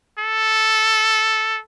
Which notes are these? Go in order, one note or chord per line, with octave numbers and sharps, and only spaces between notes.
A4